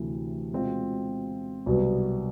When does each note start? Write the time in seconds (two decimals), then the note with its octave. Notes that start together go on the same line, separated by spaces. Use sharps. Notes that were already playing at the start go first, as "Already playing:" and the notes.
Already playing: D2 C3 E3 A3
0.52 B2 G#3 C4 F4
1.66 C2 B2 F#3 B3